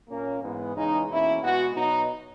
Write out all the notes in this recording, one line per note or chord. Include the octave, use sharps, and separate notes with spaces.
A#2 A#3 C#4
G#2 E3 B3
E2 C#3 E3 G#3 D#4
E2 B2 A#3 C#4 E4
B2 G#3 B3 F#4
B2 F#3 B3 D#4